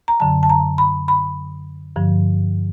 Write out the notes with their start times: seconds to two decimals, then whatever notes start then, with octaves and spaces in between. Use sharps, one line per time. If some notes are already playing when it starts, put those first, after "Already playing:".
0.08 A#5
0.20 F#2 D3 F#3 A5
0.43 A5
0.50 A#5
0.78 B5
1.08 B5
1.96 G2 D3 F3